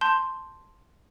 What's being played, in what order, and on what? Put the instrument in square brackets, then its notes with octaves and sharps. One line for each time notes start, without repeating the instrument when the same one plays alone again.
[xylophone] A5 C6 G6